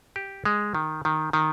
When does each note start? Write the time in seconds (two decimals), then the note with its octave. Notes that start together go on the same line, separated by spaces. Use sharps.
0.16 G4
0.45 G#3
0.75 D#3
1.05 D#3
1.33 D#3